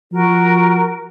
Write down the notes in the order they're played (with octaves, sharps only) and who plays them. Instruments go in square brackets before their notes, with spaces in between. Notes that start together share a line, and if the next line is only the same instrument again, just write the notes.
[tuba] F3 [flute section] F#4 A#4